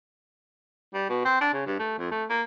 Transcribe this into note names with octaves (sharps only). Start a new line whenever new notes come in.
G3
B2
C4
D4
C#3
G2
A3
F2
A3
A#3